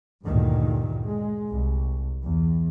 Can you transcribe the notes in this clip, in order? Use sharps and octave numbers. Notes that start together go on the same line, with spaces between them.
D2 G2 A#2 D#3
G#3
C2
E2